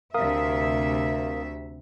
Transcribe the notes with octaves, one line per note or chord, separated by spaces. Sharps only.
D2 C3 A#4 E5 F5 D#6